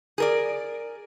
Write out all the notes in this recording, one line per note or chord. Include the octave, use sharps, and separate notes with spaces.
G#4 A#4 D5